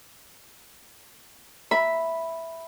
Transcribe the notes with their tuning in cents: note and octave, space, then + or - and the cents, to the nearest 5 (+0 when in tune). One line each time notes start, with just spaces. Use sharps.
E5 +0 B5 +0